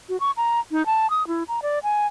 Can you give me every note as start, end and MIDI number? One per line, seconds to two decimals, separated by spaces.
0.09 0.19 66
0.20 0.31 85
0.37 0.60 82
0.72 0.85 63
0.86 1.09 81
1.10 1.26 87
1.27 1.43 64
1.48 1.60 82
1.63 1.79 74
1.83 2.07 80